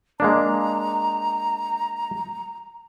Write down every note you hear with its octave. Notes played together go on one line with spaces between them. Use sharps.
G#3 A#3 D4 A#5